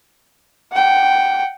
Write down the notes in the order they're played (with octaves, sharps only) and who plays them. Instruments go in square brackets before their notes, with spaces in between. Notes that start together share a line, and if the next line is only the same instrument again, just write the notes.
[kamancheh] F#5 G5